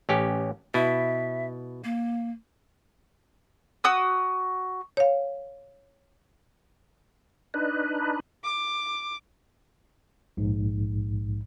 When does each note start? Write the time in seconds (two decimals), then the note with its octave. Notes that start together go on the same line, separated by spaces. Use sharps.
0.09 A1 C#4 G4
0.74 B2 E4 E5
1.84 A#3
3.84 F#4 D#6 E6
4.97 C#5 F5
7.54 D4 D#4 B4
8.44 D6
10.37 A#1 G#2